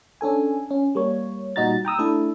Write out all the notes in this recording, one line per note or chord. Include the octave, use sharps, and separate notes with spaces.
C#4 D4 A4 G#5
C#4
G3 A#3 C#5
A#2 G3 D#4 F#4 A#5 A6
G5 A#5 D#6 E6
A3 D4 E4 A4